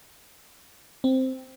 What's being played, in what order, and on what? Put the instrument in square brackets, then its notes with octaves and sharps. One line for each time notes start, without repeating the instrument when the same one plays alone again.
[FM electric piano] C4